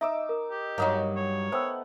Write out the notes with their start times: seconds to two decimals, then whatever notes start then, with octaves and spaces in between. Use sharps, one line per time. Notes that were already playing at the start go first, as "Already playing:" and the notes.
0.01 D#4 E5 D6 E6
0.29 A#4
0.51 G4
0.78 G2 F#3 A#3 D#4 F#4
1.16 C#5
1.52 A3 B3 C5 F#5 G5 E6